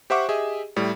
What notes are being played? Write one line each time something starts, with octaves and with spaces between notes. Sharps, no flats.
G4 C5 E5 F#5 C#6 D6
G4 G#4 D#5 E5
A2 G3